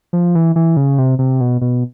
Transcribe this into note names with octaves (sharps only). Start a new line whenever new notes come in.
F3
E3
E3
C#3
C3
C3
B2
B2